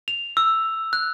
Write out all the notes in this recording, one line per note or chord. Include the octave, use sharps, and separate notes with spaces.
F7
E6
F#6